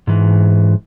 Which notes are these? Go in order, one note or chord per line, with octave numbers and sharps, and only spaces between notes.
G#2 E3